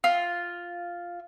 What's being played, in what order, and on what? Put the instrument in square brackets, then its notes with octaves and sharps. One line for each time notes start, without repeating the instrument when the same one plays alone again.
[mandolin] F4